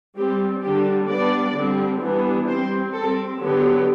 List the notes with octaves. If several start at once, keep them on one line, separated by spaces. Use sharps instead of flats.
G3 C4 G4
D3 G3 D4 G4
G3 B3 D4 D5
D3 G3 C4
E3 G3 B3 D4
G3 C4 C5
G3 C4 A4
D3 F#3 B3 G4